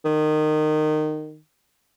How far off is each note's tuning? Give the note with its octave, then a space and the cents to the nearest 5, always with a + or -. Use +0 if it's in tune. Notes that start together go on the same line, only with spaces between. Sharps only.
D#3 -20